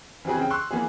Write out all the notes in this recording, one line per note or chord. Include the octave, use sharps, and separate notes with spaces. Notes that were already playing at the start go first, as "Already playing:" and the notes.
E3 C4 G4 G#4 B4
C#3 G5
C6 C#6 E6 F#6
E3 A#3 B3 G#4